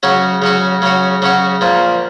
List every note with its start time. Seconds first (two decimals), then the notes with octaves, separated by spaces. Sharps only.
0.03 C#3 F#3 C#4 F#4
0.42 C#3 F#3 C#4 F#4
0.82 C#3 F#3 C#4 F#4
1.22 C#3 F#3 C#4 F#4
1.61 A#2 F3 A#3